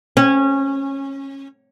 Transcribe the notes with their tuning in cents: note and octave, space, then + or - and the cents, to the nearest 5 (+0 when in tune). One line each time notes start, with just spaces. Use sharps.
C#4 -20